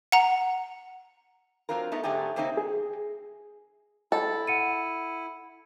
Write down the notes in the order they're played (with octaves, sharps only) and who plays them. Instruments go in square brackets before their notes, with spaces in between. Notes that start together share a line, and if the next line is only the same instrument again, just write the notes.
[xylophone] F#5 A#5
[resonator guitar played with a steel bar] F#3 C4 D4 F4 A#4
A3 B3 D#4
G#2 D3 A3 C4 G4 G#4
C#3 A#3 C4 D4 D#4 E5
[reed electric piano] G#4
[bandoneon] E4 [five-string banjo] A4
[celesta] F#5 C#7 D#7